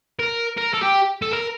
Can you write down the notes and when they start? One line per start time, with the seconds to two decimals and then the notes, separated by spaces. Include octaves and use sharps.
0.19 A#4
0.57 A#4
0.73 A4
0.82 G4
1.22 A4
1.33 A#4